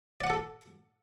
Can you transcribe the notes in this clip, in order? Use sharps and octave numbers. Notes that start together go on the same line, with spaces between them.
A4 D5 F#5 D6